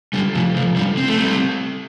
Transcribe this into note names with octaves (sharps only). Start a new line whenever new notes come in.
D3 G3
C3 F3
C3 F3
D3 G3
C4
A3
G3 C4